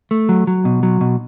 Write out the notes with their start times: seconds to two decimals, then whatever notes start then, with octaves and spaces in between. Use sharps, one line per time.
0.11 A3
0.29 F#3
0.47 F#3
0.65 B2
0.83 F#3
1.01 B2